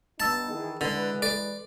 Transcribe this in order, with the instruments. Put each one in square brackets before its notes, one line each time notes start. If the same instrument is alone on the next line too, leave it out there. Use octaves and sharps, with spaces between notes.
[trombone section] G2 B3 D#4 [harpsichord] A5 [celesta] E6 A6
[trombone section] D#3 E3 G#4
[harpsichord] D3 [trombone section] E3 G#3 B4
[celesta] A4 [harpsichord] D5